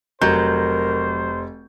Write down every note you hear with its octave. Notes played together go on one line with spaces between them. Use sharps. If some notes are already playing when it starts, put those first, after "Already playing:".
F1 F#3 A#4 C5 G6